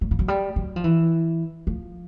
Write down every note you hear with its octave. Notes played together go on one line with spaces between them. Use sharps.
F#3
F3
F#3
G3
F#3
F3
E3
F3